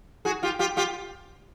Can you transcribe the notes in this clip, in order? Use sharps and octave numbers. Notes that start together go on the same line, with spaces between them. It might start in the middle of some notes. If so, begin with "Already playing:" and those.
F#4 G#4
F4 G4
F4 G4
F4 G4